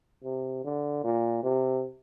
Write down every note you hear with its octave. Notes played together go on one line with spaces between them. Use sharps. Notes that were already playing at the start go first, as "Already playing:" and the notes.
C3
D3
A#2
C3